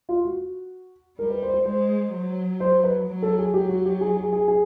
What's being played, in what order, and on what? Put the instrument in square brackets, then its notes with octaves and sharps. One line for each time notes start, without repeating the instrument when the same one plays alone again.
[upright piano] F4
F#4
[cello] G3 [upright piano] A#4
[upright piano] B4
C5
C5
[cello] G#3 [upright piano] C5
[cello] F#3
[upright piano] C5
B4
[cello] F#3
[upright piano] A4
G#4
[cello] F#3 [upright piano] G4
[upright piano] F#4
G4
G#4
G#4
G#4
G#4